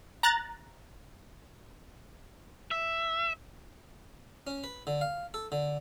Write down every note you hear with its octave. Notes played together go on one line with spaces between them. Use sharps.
A#5 F#6 A6
E5
C#4
B4
D3
F5
A4
D3